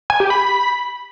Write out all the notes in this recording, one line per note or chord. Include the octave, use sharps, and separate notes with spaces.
G#5
G4
B5